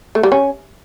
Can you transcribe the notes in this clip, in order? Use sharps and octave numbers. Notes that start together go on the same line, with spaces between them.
A3
G3
C#4